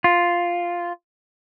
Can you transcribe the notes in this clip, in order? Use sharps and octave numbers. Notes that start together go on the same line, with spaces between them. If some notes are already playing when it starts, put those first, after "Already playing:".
F4